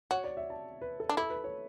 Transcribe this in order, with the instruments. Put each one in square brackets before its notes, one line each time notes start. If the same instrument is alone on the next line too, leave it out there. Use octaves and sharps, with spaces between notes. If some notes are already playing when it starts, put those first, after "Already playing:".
[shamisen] F#4 [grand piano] C#5
[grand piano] D5
E5
A5
B4
A4
[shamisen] D4
[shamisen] E4 [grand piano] A4
[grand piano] B4
C#5